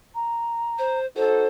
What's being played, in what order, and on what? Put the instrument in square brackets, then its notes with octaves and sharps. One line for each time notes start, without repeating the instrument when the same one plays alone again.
[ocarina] A#5
[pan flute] C5
[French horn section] D#4 F#4 A4 [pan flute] C5